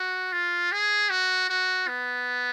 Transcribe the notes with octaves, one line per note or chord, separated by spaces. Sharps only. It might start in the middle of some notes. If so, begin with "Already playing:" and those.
Already playing: F#4
F4
G#4
F#4
F#4
B3